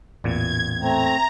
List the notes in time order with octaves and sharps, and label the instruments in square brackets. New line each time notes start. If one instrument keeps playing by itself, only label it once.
[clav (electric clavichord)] A1 E2 A#2 [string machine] G#6
[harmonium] A3 C4 [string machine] A#5